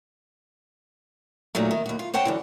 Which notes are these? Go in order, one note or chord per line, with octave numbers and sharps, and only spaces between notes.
A#2 D3 D#3 F#3 A3
D#3
D#2 F#4
F4
C5 C#5 F#5 G5 A5
F#2 D3 E3